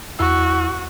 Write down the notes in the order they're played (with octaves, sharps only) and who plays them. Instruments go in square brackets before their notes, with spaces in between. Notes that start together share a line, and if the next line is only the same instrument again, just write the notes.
[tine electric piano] E2 E4 E6 [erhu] F#4